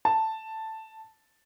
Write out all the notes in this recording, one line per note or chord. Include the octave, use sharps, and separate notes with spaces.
A5